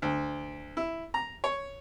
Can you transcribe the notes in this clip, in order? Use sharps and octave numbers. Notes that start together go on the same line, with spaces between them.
D2
E4
A#5
C#5